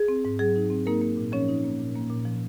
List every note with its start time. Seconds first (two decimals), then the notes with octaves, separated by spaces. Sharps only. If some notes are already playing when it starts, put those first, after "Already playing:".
Already playing: G#4
0.08 C4
0.25 G#2
0.39 F#3 G#4
0.56 D#4
0.70 C4
0.86 A#3 D#4 A#4
1.01 A#3
1.17 A#2
1.32 F3 C#4 C#5
1.49 D#4
1.64 A#3
1.80 A#2
1.96 A#3
2.10 A#2
2.25 F3